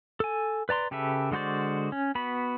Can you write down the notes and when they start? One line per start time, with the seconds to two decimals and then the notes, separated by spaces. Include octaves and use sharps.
0.20 A4 G#5
0.69 B4 D5 A#5 C6
0.91 C#3 G4 A4 B4 E5
1.31 D3 G#3 F#4 C5 D5
1.92 C#4
2.15 B3 F#4 B5